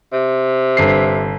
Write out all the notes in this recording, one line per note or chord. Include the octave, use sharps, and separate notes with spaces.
C3
G1 C7